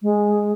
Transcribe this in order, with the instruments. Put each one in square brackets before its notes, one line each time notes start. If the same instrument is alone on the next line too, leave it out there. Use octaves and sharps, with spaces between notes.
[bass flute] G#3